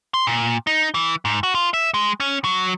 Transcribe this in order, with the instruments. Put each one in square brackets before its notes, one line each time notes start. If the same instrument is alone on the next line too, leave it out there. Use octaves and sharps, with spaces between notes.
[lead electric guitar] C6
A#2
D#4
E3
G#2
F#4
F4
E5
G#3
C#4
F#3